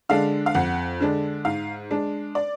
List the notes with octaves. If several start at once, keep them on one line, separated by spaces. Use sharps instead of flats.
D3 G#3 D4 F5
F5
F2 F#5
D3 G#3 D4
G#2 F5
G#3 D4
D5